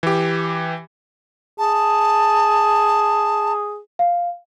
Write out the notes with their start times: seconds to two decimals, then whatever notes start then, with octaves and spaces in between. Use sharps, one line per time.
0.03 E3 G4
1.58 G#4 A5
3.99 F5